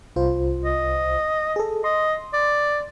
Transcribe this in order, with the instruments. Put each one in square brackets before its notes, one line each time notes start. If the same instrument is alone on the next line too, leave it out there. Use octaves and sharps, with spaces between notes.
[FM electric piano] C2 F4 C5
[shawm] D#5
[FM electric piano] G#4 A4
[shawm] D#5 [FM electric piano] C6
[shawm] D5